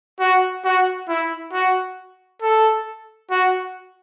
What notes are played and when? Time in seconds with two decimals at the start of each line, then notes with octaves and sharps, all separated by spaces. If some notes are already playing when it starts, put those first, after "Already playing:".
0.20 F#4
0.65 F#4
1.09 E4
1.53 F#4
2.42 A4
3.31 F#4